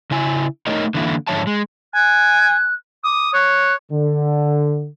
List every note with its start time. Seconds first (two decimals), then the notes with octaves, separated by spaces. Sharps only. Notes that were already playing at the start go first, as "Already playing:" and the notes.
0.11 C#3 E4 G#5
0.67 A3 D#4 A#4 C#5 D#5
0.94 D3 E3 A#3 E4
1.27 G#2 D3 F3 C#5 E5 A5
1.47 G#3
1.94 G#5 F#6
3.04 D6 D#6
3.33 C#5 F#6
3.92 D3